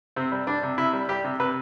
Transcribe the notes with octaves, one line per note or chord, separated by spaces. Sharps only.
C3 C4
G3
G3 D4
C3
C3 E4
G3
G3 G4
C3
C3 B4